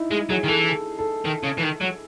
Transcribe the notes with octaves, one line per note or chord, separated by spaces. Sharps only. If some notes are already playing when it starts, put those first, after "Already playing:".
Already playing: D#4 E4
G#3
F#3 G#4
D#3
E3 A4
A4
D#3
C#3
E3
D#3
F#3